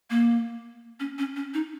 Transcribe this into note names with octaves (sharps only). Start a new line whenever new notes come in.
A#3
C#4
C#4
C#4
D#4